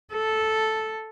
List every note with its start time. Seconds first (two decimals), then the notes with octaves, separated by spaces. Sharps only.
0.13 A4